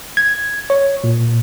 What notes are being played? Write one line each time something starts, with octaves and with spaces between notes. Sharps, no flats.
G#6
C#5
A#2